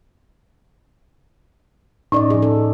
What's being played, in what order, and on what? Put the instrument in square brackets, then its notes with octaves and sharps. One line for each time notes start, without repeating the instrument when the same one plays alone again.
[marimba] A2 C#4 [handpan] D#4 D5 D#5
[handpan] F3 G#4
A4